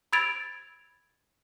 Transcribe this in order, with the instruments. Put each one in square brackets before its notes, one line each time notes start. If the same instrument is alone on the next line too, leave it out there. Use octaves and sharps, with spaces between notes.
[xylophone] B5 E6 G#6 A6 D7 F7